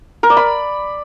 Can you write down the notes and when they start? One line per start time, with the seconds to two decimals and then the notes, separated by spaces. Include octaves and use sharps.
0.23 A#4
0.30 D5
0.37 B5